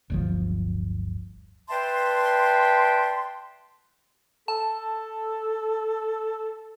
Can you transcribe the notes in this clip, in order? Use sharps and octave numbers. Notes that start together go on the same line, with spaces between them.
D1 G1 F3
B4 D5 E5 G5 A5 C6
A4 A5